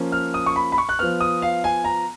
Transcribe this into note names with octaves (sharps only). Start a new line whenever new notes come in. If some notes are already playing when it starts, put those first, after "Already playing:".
Already playing: F3 A#3 C#4
F6
D#6
C#6
B5
B5
C#6
F#6
F3 B3 F6
D#6
F5
G#5
A#5